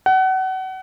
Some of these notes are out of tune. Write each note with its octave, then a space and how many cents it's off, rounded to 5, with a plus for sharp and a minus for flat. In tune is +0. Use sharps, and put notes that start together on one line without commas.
F#5 +30